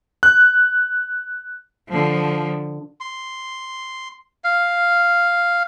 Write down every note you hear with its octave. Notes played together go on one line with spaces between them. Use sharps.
F#6
D3 F3
C6
F5